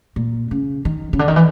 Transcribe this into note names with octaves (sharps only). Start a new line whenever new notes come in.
A#2
C#3
D#3
C#3
D3
D#3
E3